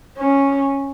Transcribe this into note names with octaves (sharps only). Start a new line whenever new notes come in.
C#4